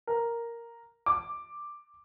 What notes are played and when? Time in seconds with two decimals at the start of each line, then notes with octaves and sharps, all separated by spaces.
0.07 A#4
1.06 D6